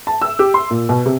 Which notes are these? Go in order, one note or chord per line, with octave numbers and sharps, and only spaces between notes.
A5
E6
G4
C6
A#2
B2
C3